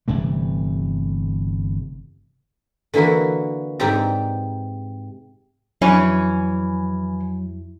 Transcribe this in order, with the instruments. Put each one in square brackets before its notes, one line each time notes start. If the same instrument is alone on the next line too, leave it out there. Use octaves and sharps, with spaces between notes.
[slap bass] G1 C3 E3 A3
[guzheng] D3 E3 A#3 E4 F#4
G#2 C3 G4 D5 A#5
[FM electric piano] F2 E4 [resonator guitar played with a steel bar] E3 C#4 [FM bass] F#3